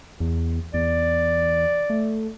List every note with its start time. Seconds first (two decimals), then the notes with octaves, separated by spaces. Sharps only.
0.20 E2
0.74 E2 D5
1.90 A3